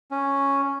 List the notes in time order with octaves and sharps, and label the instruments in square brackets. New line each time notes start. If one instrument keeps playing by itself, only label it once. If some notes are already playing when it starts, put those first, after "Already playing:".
[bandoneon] C#4